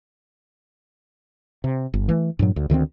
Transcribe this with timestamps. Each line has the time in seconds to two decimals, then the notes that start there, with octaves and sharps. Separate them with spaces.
1.64 C3
1.94 G1
2.09 E3 A3
2.39 G2 A#2 F#3
2.56 D2
2.70 D2 D#3 G3 C4